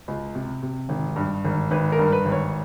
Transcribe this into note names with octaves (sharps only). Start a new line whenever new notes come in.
C#2
C3
C3
G#1
G2
G#1
G#1 B4
A#4
G2
B4
G#1
C#5